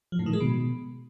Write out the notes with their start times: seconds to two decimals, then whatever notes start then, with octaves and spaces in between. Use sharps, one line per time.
0.12 F3
0.19 A2
0.26 D#3
0.33 G#3
0.40 B2